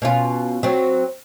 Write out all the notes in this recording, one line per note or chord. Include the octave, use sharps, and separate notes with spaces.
B2 C#4 F4
F#3 C4